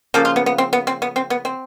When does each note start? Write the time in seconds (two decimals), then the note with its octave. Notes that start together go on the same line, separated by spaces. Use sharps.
0.14 C#3 F3 A#3 A4
0.25 F4
0.36 B3
0.46 B3
0.58 C4
0.73 B3
0.87 C4
1.02 B3
1.16 C4
1.30 B3
1.45 C4